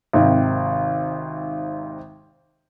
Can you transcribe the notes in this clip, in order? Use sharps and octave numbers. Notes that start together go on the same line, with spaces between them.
G#1 C3 D#3